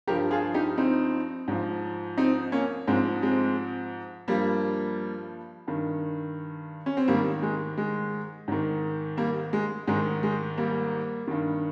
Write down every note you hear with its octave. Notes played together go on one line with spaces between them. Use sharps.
G2 F3 G4 A#4
F4 G#4
D#4 G4
C4 D#4
G#2 F3
C4 D#4
A#3 C#4
G#2 F3 G#3 C4
G#3 C4
G2 F3 G3 A#3
G2 D#3
C#4
C4
G#2 D#3 G3 A#3
G#3
G#3
G#2 D#3
G3 A#3
G#3
G#2 D#3 G#3
G#3
G3 A#3
G2 D#3